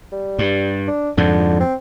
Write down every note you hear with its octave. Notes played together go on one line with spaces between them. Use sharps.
G3
G2
D4
F2 G#2 D3 F3
C4